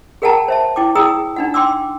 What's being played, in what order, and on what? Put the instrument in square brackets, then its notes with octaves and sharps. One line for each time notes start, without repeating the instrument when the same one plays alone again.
[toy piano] G#4 A#4 F#5 G5 A5 A#5
C5 E5 A5
E4 G5 D6
E4 G#4 G5 A#5 D#6 E6
D4 D#4 F#5
G5 C6 D6 E6